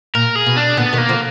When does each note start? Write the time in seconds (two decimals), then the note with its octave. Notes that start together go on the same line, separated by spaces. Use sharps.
0.15 A#2 A#4
0.36 G#4
0.46 B2
0.57 D4
0.77 A#2 D3 B3
0.93 B2 D#3
0.98 A#3
1.09 D3 F3